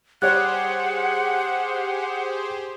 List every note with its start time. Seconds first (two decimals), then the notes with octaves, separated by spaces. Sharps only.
0.22 G3 G4 G#4 C5 C#5 F#5 F#6